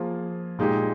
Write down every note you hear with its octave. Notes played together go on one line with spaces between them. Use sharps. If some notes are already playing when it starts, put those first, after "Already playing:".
Already playing: F3 A#3 F4 G#4
A#2 G#3 D#4 G4